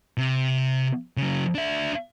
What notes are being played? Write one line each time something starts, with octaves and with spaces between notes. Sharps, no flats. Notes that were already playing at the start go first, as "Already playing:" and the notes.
C3
C#3 F#3
D4 E5